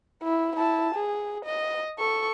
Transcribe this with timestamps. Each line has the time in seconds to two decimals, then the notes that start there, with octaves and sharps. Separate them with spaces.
0.23 E4
0.55 E4 A5
0.95 G#4
1.45 D#5
1.99 A4 C#6